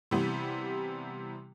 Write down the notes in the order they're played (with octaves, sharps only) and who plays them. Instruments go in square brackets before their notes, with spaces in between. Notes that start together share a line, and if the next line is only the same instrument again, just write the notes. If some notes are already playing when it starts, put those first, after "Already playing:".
[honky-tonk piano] C3 E3 G3 B3